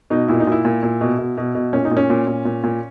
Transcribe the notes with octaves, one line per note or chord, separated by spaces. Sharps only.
B2 D#4
A#2 E4
D#4
A#2 E4
A#2
A#2
B2
B2
B2
B2
A#2 C#4
D#4
A#2
C#4
A#2
A#2
A#2
A#2